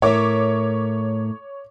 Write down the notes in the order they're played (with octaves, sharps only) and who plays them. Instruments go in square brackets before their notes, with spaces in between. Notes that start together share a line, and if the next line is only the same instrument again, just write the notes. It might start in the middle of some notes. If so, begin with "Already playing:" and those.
[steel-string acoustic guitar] A2 A#4 E5 [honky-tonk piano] C#5 D6